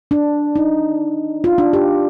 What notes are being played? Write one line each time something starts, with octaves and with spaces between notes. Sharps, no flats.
D4
D#4
F4
D4
G4